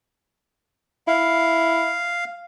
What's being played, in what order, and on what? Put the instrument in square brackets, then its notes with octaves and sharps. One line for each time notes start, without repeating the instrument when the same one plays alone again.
[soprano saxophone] E4 [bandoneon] F5